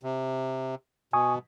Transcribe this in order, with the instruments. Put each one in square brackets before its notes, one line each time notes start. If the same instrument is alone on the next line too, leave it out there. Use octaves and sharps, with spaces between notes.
[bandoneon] C3
[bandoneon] B2 [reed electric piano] G#5 C#6 D#6